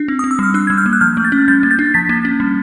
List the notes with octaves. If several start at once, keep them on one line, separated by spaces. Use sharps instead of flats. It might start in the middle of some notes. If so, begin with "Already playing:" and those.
Already playing: D4
C4
C4 D#6
E6
G3 F6
D4 E6 F#6
G3 G#6
F6 G6
A#3
F#6
F3 F6 G6
A3
G6 A6
C#4
G3 G6 A6
A#3
G6 A6
D4
F3 A6 B6
A#3
C#4
G3